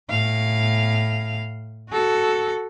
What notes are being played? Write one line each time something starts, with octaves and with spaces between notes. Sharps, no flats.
A2 F5
F#4 A4